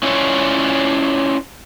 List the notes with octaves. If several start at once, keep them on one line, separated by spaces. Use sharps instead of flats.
C#4 E4 F4 C#5 D5